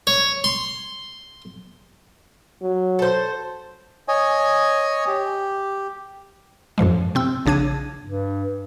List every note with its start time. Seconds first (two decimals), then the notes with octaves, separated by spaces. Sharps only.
0.07 C#5
0.44 C6
2.62 F#3
2.99 A4 C5
4.08 C#5 D#5 G#5
5.07 G4
6.78 F#2 A2 F3 G#3
7.15 C3 C4 E6
7.46 A#1 C#3 D4 G#6 D#7
8.05 G2